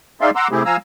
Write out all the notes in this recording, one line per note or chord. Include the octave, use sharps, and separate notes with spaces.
D#4 G#4 D5 E5 F5 C6
F#5 A#5 C6 D6 E6
C3 A3 C4 E4 G4 G#4
F3 F5 G#5 A#5 E6